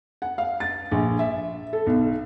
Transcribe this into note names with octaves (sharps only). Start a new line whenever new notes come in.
F#5
F5
A6
A#1
E5
A4
B1